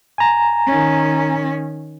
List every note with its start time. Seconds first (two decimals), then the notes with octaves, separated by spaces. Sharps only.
0.18 G#5 A#5
0.67 D#3 C#4